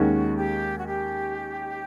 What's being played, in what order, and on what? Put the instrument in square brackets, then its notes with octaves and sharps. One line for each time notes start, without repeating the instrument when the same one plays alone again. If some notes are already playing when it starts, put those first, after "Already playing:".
Already playing: [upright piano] D#2 D#3 G#3 C#4 [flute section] F#4
[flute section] G4
F#4
G4